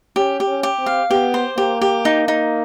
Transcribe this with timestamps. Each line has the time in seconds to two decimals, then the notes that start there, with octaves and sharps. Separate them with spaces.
0.16 C#4 G4
0.40 G4
0.47 C#4
0.63 G4
0.79 C4
0.86 F5
1.10 B3 G4
1.34 C5
1.57 A#3 G4
1.82 G4
2.05 D#4
2.28 D#4